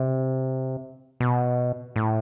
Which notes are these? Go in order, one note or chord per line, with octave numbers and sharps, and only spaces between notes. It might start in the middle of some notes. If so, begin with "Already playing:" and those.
Already playing: C3
B2
A2